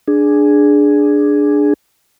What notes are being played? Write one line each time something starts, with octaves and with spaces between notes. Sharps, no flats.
D4 G#4